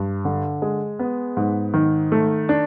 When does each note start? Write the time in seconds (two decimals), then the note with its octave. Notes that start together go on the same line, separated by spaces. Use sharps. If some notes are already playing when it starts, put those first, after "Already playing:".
Already playing: G2
0.25 D3
0.62 G#3
0.99 B3
1.37 G#2
1.74 D#3
2.12 A3
2.49 D4